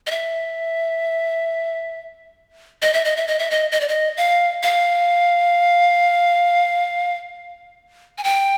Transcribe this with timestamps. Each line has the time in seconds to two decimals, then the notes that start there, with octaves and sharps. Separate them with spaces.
0.07 D#5
0.11 E5
2.82 D#5
2.93 E5
3.05 D#5
3.17 E5
3.28 D#5
3.39 E5
3.51 D#5
3.72 D#5
3.81 D5
3.88 D#5
4.17 F5
4.63 F5
8.18 G#5
8.24 G5